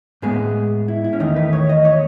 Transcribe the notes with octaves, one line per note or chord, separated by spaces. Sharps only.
A2 G#3 B3 G#4
E4
E4
C#4
E2 D#3 A3 D#4
B4
C#5
D#5
C#5